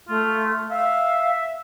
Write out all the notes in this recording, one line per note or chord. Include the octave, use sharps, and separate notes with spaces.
A3 F4
E5 F5